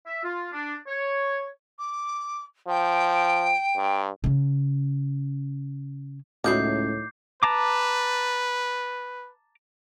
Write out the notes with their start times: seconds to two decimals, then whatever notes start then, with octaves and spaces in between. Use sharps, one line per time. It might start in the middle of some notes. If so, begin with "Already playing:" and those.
0.06 E5
0.24 F4
0.52 D4
0.88 C#5
1.79 D6
2.69 F3 G5
3.76 G2
4.24 C#3 C#4
6.44 C#2 A2 D#3 F#3 E4 D6 G6 C7
7.43 B4 A5 A#5 D6